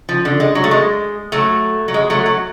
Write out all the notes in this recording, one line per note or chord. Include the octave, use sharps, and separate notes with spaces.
F3
D3
G#3
F#3
A3
G#3
F#3 A3
F#3
G#3
F#3 A3
F#3